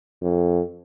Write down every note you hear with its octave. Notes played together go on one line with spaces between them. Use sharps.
F2